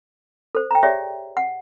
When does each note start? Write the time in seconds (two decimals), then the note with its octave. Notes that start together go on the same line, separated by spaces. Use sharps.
0.55 A4 C5
0.71 G5 A#5
0.83 G4 G#4 C#5 D5 E5 G5
1.37 F#5